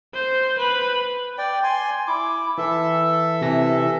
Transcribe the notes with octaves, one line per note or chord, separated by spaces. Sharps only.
C5
B4
D5 G5
G#5 C6
E4 D6
E3 A4 E5
C3 E3 A#6